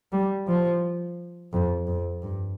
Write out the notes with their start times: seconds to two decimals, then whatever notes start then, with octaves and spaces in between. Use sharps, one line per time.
0.12 G3
0.47 F3
1.53 F2
1.87 F2
2.22 G2